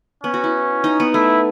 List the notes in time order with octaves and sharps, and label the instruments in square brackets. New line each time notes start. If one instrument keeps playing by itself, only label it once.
[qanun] B3 [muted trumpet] C#4
[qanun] F#4
E4
D#4
B3
[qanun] A3 [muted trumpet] E4